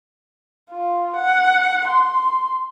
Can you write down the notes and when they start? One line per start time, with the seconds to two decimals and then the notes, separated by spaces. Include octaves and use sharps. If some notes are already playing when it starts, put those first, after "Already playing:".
0.71 F4
1.16 F#5
1.88 C6